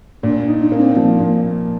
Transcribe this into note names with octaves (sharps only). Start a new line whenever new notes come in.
A#2 D4
D#4
D4
A#3
C4
F3 A#3
A#2